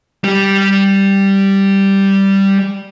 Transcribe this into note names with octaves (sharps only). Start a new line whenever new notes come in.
G3 G4